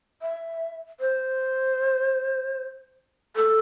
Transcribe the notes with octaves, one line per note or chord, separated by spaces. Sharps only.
E5
C5
A4